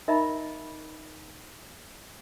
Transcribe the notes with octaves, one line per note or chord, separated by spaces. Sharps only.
D#4 A#4 D#5 E5 A#5 B5